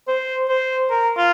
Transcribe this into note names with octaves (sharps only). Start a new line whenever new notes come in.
C5
C5
A#4
F4